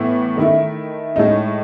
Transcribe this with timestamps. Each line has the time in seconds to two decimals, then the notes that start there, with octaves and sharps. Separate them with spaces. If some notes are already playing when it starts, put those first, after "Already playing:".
Already playing: A2 E3 B3
0.37 D#3 A3 E4
1.16 A2 G#3 D#4